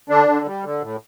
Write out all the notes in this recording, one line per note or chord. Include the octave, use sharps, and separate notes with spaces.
D3 D4
D3
G3
D3
A2